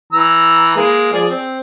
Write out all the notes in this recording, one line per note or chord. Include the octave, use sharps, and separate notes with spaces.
E3 A#5 E6
G#3 A#3
F3 G#4 D5
C4